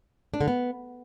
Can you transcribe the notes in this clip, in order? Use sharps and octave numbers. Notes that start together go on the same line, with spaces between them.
D4
D3
B3